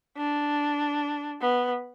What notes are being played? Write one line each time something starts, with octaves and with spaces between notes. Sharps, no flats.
D4
B3